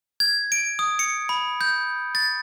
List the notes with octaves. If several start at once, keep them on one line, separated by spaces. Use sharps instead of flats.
G#6
D7
D#6
C#7
B5
G6
A6